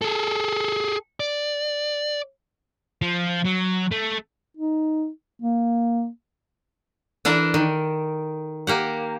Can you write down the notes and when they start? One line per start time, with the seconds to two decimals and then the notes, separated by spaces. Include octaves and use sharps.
0.02 G#4 A4
1.20 D5
3.02 F3
3.45 F#3
3.91 A3
4.57 D#4
5.42 A#3
7.25 E3 D4 A4 A#4 D5
7.54 D#3
8.67 A#3 G4 F#5